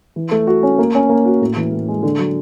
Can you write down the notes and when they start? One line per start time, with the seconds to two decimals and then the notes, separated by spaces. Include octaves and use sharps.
0.16 E3
0.31 A3
0.47 F#4
0.63 C#4
0.78 A#3
0.95 C#4
1.09 A#3
1.25 F#4
1.41 A2
1.56 E3
1.72 A2
1.88 G#3
2.03 D3
2.19 F#3